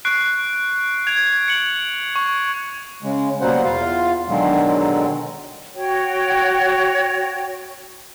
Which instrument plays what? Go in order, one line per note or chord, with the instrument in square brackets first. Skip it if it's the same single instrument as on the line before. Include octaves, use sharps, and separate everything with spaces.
[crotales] C#6 F#6 C7 D7
G#6 D7 F7
C#7 F#7
C#6
[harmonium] C#3 G#3
B2 F#3 G3 A#3 C5 F#5
E2 F4 F5
B2 D3 D#3 F#3 G#3
[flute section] F#4 C#5 G5